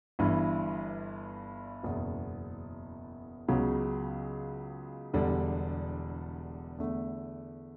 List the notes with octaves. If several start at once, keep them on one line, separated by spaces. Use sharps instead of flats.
G1 G2 E3
F#1 E2 B2
C#2 C#3 F#3 B3
E1 E2 D3 G3 D4
E2 D3 A3